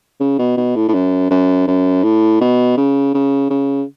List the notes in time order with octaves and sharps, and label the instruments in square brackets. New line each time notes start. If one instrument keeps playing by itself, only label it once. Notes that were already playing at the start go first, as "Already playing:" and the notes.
[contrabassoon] C#3
B2
B2
A2
A2
F#2
F#2
F#2
A2
B2
C#3
C#3
C#3